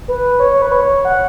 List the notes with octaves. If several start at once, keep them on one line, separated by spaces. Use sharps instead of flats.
B4
C#5
B4
C#5
F#5